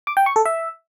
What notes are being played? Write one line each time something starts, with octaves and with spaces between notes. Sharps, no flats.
D6
G5
C#6
A4
E5